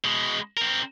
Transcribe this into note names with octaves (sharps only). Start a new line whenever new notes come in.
B2 G#3
C4 A#4